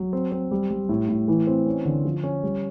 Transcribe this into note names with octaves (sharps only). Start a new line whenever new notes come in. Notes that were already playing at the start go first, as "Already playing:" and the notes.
Already playing: F#3
C4
C4
G3
G3
A2
A2
E3
C4
C#4
D3
F3
C#4
G3